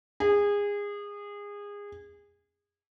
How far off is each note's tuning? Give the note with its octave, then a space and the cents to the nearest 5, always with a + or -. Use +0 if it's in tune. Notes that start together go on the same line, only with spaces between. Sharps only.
G#4 -25